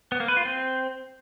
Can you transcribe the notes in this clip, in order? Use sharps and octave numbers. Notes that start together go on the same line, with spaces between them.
B3
A#3
B4
F4
C4